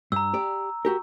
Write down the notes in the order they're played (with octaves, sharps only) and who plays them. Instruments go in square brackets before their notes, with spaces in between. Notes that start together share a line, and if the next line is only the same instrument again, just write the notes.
[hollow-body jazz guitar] G2 [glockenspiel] A#5 E6
[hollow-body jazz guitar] G4 D5
F#4 G4 A#4